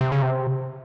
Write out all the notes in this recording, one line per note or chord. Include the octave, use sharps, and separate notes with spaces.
C3
C#3
C3